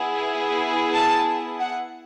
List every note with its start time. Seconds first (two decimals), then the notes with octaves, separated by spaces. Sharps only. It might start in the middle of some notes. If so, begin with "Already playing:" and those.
Already playing: B3 E4 G#4
0.93 A5
1.59 F#5